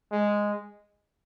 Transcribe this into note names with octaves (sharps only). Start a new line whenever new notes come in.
G#3